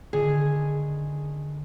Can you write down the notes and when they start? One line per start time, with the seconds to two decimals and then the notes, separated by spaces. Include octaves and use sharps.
0.13 D3 D#3 G#4 D#6